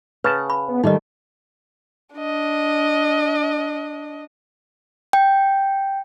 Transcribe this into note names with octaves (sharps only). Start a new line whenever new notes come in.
C#3 B4 F#5 A5
B5
B3
D#3 G3 A3 D#4 D#5
D4 D#5
G5